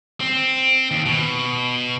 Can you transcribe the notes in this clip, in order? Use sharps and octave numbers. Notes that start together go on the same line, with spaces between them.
C4
D#2
B2